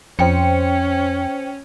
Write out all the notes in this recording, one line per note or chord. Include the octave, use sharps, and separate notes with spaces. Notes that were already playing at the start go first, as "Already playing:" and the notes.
F2 C#4 C5 G5 C#7